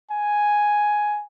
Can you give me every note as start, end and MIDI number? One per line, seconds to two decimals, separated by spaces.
0.11 1.24 80